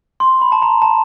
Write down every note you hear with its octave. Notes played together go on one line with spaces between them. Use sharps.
C6
B5
A5
A#5
A5